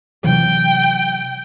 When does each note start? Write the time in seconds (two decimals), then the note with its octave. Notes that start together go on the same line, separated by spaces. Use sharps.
0.24 C3 E3 F#3 G5